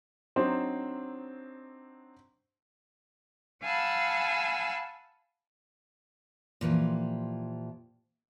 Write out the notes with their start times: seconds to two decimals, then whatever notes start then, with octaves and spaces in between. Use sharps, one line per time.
0.36 F#3 C4 D4 D#4 C5
3.63 F5 F#5 G#5 A5 B5 E6
6.61 A#2 E3 F3 G4